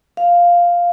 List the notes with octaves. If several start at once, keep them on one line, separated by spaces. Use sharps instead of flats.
F5